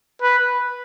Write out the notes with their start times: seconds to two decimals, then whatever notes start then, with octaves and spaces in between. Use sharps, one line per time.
0.22 B4